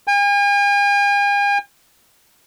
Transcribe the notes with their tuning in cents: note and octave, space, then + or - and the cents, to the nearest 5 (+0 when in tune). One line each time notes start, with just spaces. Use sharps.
G#5 -45